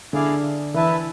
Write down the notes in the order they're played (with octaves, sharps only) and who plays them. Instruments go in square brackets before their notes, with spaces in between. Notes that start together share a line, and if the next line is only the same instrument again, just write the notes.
[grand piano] D3 [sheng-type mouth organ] E4 G#4 D5 F5
[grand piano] E3 [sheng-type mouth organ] E4 B4 E5 A5